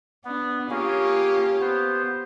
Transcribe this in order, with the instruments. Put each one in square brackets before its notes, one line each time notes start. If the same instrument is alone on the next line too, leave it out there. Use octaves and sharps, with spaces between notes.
[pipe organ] B3 [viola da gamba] D4
[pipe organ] A#3 C#4 G#4 [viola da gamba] F4 G4 C#5
[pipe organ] B3 C5